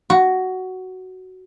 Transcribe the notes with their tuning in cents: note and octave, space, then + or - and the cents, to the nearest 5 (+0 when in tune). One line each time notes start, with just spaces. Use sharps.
F#4 +10